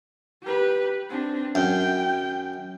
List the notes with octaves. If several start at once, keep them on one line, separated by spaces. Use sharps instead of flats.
G4 B4
C4 D4
F#2 G5